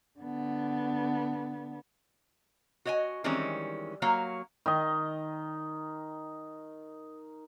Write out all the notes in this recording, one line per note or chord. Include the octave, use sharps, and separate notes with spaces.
D3 B3
F#4 C#5 D#5 G5 G#5
D#3 E3 G3 G#3 C4 C#4
F#3 A#3 C#5 F5
D#3 D#5